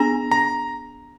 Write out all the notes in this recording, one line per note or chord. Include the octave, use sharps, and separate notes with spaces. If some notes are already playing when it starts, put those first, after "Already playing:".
Already playing: B3 D4 G#4 A#5
A#5